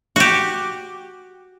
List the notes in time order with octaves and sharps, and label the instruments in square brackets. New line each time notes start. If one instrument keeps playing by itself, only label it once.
[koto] F#4 G4